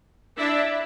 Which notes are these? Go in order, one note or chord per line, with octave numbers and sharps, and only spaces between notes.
D4 E4